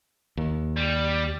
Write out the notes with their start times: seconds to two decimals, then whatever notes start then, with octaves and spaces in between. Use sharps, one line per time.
0.37 D#2
0.76 G3